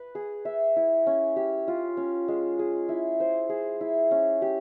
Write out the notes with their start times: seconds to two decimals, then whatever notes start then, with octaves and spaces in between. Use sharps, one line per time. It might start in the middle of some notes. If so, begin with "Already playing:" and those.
Already playing: B4
0.15 G#4
0.45 E5
0.76 E4
1.07 C#4
1.36 G4
1.68 F4
1.97 C#4
2.28 G#3
2.59 G#4
2.89 E4
3.20 C5
3.49 G#4
3.81 E4
4.11 C#4
4.42 G4